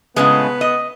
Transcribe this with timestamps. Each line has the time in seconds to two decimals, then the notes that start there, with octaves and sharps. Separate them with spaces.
0.16 A2 C#3 G#3 B3
0.61 D#5